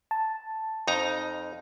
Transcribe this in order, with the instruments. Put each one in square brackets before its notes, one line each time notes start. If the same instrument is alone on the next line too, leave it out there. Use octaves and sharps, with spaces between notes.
[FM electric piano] A5
[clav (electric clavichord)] F2 D#4 A#5